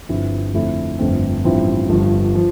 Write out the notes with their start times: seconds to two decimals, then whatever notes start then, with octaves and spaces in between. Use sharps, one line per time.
0.09 G1 G2 F3 C4 E4
0.54 F2 D3 A3 C4 E4
0.99 G1 F2 D3 A3 C4
1.44 A1 G2 F3 C4 E4
1.89 G1 G2 F3
2.35 F3